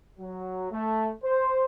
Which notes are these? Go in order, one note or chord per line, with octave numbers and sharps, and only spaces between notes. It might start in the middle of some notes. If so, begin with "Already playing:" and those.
F#3
A3
C5